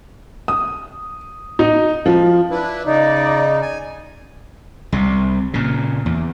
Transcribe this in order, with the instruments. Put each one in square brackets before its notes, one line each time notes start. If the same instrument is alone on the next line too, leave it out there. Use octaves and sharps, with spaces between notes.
[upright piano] D#6
D#4
F3
[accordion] D4 E4 B4
[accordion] C#3 D#4 [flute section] D5 D#5
[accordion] G#5
[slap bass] C2 C3
A#2 C#3
E2